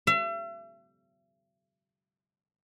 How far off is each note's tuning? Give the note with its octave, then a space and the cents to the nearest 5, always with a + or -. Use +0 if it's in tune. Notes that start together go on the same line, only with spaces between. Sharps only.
E5 +40